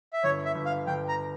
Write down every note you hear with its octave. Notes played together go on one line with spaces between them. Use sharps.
E5
G1 C#5
E5
G1
F5
G1 G5
A#5